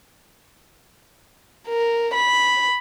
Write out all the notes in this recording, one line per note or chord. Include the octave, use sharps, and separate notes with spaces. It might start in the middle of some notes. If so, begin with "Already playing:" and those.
A#4
B5